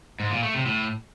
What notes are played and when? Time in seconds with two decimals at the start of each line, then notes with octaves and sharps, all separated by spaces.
0.20 G#2
0.31 A#2
0.43 A3
0.54 C3
0.66 A2